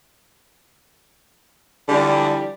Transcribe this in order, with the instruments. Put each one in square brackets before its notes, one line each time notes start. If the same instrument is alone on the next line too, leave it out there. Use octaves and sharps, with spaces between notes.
[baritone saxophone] D3 [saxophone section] E3 F3 G3